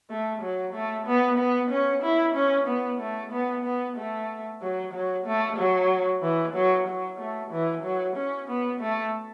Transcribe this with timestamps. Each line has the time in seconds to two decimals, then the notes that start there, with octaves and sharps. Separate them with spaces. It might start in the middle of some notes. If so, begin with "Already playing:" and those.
0.10 A3
0.43 F#3
0.74 A3
1.07 B3
1.39 B3
1.71 C#4
2.03 E4
2.36 C#4
2.67 B3
3.01 A3
3.32 B3
3.65 B3
3.97 A3
4.62 F#3
4.93 F#3
5.27 A3
5.58 F#3
6.22 E3
6.55 F#3
6.87 F#3
7.19 A3
7.52 E3
7.84 F#3
8.16 C#4
8.48 B3
8.81 A3